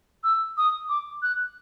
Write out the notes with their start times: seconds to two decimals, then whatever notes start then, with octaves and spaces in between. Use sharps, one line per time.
0.24 E6
0.57 D#6
0.89 D6
1.22 F#6